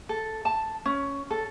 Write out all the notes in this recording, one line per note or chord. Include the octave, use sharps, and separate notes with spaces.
A4
A5
C#4
A4